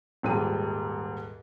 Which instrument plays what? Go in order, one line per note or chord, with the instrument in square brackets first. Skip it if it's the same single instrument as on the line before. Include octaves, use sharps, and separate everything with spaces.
[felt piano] D#1 G#2 G3 D#7